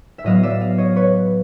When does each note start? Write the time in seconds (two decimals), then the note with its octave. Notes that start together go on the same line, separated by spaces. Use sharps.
0.18 E5
0.24 A2 F#3 B3 D#5 F5
0.43 D5 E5
0.61 D#5 F5
0.78 C#5 D#5
0.96 B4 C#5